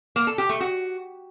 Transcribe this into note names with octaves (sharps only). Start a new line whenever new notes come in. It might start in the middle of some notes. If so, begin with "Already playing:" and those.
A#3
A4
G4
A3
F#4